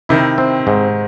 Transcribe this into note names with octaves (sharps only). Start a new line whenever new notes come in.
C3 D#3 E4
C4
G#2